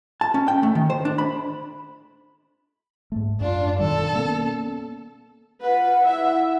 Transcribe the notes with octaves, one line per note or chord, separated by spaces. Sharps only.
A5
C#4
G5
A3
D#3
C5
D4
B5
G#2 A3
F#2 D4 F4
B2 D#3 G3 A4
A#3 B3 C#4
F4 B4 F#5
E4 E5